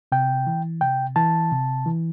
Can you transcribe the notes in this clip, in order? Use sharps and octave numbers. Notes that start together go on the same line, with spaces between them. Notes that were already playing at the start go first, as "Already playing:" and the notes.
C3 G5
E3
C3 G5
E3 A5
C3
E3